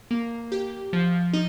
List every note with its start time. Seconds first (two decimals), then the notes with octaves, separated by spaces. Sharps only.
0.11 A#3
0.52 G4
0.93 F3
1.33 D#4